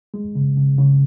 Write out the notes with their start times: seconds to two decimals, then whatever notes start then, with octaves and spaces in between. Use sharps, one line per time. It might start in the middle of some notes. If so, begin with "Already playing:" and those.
0.14 G#3
0.35 C#3
0.57 C#3
0.78 C#3